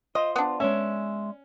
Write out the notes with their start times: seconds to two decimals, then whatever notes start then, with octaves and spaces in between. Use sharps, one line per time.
0.15 F4 C5 D#5
0.36 B3 D4
0.60 G#3 C#4 E5